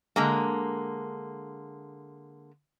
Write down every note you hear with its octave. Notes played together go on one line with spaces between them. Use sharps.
D3 G#3 A#3